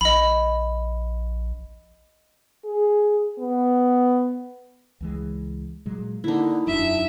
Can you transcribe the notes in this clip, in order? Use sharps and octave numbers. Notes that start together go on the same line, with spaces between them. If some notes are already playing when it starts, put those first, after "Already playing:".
A#1 D#5 B5
G#4
B3
C#2 E3 G#3
A#2 F#3 G#3
D3 A#3 D#4 E4
E1 F#2 F#3 D4 E5